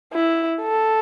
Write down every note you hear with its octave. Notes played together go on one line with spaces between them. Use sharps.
E4
A4